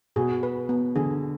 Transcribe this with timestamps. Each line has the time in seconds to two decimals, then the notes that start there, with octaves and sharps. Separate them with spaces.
0.16 B2 G#4
0.43 B4
0.69 B3
0.96 D3 G#4